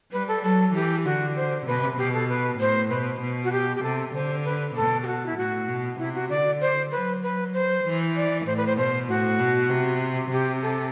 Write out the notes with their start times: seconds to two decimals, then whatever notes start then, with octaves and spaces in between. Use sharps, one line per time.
0.12 G3 B4
0.28 A4
0.43 F#3 A4
0.74 E3 G4
1.05 D3 F#4
1.36 C5
1.66 C3 B4
1.98 B2 G4
2.14 A4
2.28 B4
2.59 A2 C5
2.90 B2 B4
3.21 B2
3.44 F#4
3.52 G4
3.76 G4
3.83 C3 A4
4.14 D3 C5
4.45 B4
4.76 B2 A4
5.03 G4
5.07 F#4
5.26 E4
5.37 A2 F#4
5.68 B2
5.99 C3 E4
6.15 F#4
6.30 D3 D5
6.61 C5
6.92 F#3 B4
7.23 B4
7.53 C5
7.84 E3
8.16 D5
8.46 A2 C5
8.57 B4
8.67 C5
8.77 B2 C5
9.08 A2 F#4
9.39 B2
9.70 C3
10.31 C3 G4
10.62 A4